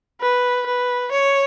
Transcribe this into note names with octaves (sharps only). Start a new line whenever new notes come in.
B4
B4
C#5